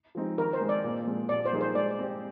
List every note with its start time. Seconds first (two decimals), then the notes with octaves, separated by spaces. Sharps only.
0.15 F3 G#3 C4 D#4
0.38 D#3 A#4
0.53 C5
0.61 G#3 C4
0.69 D5
0.84 A#2
1.07 G#3 C4
1.29 A#2 D5
1.46 C5
1.53 G3 A#3 D#4 G#4
1.61 C5
1.75 G#3 D5
1.99 C4 G4